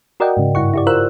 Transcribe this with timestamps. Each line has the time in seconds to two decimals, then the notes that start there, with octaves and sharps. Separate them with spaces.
0.20 F#4 A#4 D5 D#5 F#5 G5
0.37 G#2 C#3
0.55 G2 E4 F#5 C#6
0.74 E4 G4 D5
0.87 F4 A#4 C5 E6 F#6